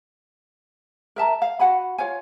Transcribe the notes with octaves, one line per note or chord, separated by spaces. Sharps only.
A#4 E5 A5 A#5
F5
F#4 F#5 G#5 B5
F4 C#5 F5 G#5